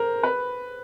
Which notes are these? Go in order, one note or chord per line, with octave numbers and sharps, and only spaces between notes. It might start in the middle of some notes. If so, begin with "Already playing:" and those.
Already playing: A#4 C5
B4